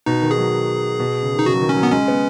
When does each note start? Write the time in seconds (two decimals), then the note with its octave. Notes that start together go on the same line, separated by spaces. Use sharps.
0.06 B2 D#4
0.22 D#3
0.31 G#4
0.38 F#3
1.00 B2
1.23 C#3
1.35 D#3 D#4
1.46 C#3 F#4
1.54 F#3
1.61 D#3
1.69 C#4
1.76 F#3
1.83 B3
1.92 G#3 C#4
2.08 B3